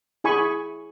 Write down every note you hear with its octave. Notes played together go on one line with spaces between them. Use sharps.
E4 G#4 G#5 B5 C#6